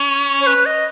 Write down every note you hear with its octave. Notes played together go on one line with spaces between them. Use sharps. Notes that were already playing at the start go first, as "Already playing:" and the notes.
Already playing: C#4
C#5
B4
D#5